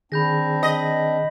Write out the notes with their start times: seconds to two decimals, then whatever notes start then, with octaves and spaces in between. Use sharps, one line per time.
0.12 D#3 C4 D4 G#4 B5 G6 A#6
0.63 D#5 B6 F#7